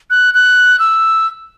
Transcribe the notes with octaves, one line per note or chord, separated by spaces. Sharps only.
F#6
F#6
E6